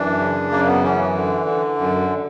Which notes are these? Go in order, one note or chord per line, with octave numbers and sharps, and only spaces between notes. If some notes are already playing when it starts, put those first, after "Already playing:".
Already playing: F#2 E3 D4
C#3
F#2 A#3
B3
E3 C#4
D3
D3
F#2